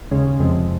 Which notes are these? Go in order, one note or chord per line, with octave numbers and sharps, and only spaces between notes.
D#2 C#3 G#3 C#4
F2 C3 F3 G#3